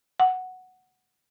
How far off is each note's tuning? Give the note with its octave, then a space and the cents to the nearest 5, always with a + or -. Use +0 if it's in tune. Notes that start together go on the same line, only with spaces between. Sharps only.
F#5 +0